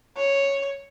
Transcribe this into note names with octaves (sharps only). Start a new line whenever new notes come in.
C#5